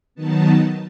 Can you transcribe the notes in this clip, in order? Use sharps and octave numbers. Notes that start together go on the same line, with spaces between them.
D#3 F#3 B3 D#4 A5